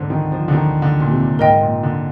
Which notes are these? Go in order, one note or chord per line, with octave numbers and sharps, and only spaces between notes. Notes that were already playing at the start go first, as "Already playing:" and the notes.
Already playing: G#2 D3 C5
D#3
F3
D3
D#3
D3
A#2
C3
G#2 A#4 D#5 G5
A#2
D3